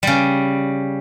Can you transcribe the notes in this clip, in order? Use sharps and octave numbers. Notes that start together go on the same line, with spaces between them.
C#3 G3